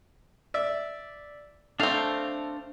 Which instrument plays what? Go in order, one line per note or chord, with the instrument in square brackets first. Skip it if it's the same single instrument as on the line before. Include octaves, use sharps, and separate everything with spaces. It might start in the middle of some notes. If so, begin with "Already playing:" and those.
[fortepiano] D5 E5
[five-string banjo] A3 C4 [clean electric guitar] D4 F5 [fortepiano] A4